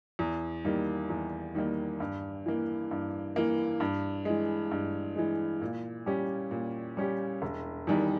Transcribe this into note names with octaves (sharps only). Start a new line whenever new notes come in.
E2
D#3 G3 A#3
E2
D#3 G3 A#3
G2
E3 A#3
G2
E3 A#3
G2
E3 G#3
G2
E3 G#3
A#2
G3 C#4 G4
A#2
G3 C#4 G4
E1
E2 D#3 G3